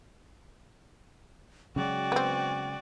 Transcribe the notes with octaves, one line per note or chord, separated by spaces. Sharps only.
C#3 F#3 G#3 F#4 D5 G5
B3 C4